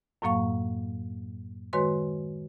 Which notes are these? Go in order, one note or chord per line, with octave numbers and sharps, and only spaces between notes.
F#2 A2 F#3 A#3 F5 C#6
D#3 G#3 F#4 B4 C#5 C6